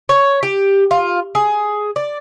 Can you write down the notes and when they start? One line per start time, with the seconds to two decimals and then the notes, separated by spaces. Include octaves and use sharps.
0.09 C#5
0.43 G4
0.91 F4
1.35 G#4
1.96 D5